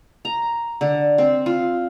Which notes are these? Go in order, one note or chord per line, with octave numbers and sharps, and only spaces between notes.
A#5
D3
C4
F4